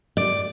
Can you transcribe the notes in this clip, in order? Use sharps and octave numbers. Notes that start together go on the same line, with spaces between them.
D5